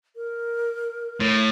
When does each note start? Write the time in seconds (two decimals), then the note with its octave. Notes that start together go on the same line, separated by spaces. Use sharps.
0.16 A#4
1.21 A2